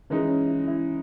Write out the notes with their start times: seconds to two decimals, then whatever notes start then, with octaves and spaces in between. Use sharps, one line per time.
0.10 E3 G#3 C#4 D#4
0.29 C#4
0.48 E4
0.68 E4